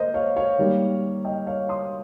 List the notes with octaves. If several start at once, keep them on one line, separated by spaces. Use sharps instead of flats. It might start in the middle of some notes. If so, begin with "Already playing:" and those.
Already playing: A#3 C5 D#5
C#5 F5
C#5 F5
D#3 G3 A#3
D#5 G5
C#5 F5
C6 D#6